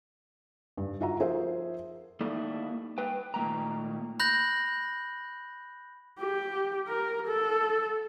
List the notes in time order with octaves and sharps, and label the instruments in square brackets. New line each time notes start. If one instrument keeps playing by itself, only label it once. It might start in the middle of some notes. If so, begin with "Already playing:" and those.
[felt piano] G2
F4 F#4 E5 F#5 A#5
F3 G#4 A#4 C5 E5
[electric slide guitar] A3 A#3 D#4 E4 A4 D5
B4 G5
A#2 D#3 A3 G5 A#5
[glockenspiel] B5 F#6 G6 A#6 F#7
[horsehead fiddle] G4
A#4
A4